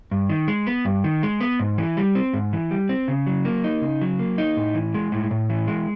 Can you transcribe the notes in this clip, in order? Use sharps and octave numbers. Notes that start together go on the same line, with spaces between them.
G2
D#3
G#3
B3
G2
D#3
G#3
B3
G#2
E3
G3
C4
G#2
E3
G3
C4
C#3
F#3
A#3
D#4
C#3
F#3
A#3
D#4
A2
E3
G#3
A2
A2
E3
G#3